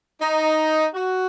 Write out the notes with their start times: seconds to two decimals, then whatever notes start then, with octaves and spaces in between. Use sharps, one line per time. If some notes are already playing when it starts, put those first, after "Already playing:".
0.21 D#4
0.94 F#4